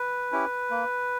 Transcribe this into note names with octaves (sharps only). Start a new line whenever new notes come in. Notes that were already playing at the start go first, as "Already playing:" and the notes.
Already playing: B4
C#4 E4 G4
A#3